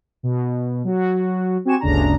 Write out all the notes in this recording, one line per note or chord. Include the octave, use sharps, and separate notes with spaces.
B2
F#3 F#4
C4 F#4 G4 G#5 C#6 E7
G1 D2 C#3 D4 A#5